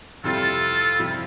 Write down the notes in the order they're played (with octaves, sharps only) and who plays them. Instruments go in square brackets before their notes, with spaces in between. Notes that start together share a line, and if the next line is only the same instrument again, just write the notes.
[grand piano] F2 C3 G3 C4 E4 [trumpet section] F4 A4
[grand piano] F2 C3 G3 C4 E4